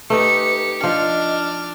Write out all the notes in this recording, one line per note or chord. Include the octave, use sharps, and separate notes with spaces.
A3 D#4 G4 B4 C#7
F3 D4 D#5 F6